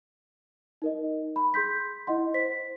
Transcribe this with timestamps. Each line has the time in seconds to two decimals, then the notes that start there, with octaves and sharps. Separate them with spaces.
0.82 D#4 A#4 D#5
1.36 B5
1.54 G#4 C6 G6 B6
2.07 E4 D#5 F#5 C6
2.34 C5 B6